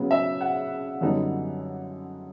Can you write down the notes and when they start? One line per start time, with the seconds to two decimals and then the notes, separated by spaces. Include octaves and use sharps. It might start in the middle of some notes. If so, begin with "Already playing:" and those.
Already playing: C#3 F#3 B3
0.11 E5
0.41 F#5
1.01 F#2 D3 G3 B3 D#4